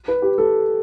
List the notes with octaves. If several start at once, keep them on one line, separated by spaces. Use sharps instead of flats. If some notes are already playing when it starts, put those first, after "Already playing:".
B4
G4
A4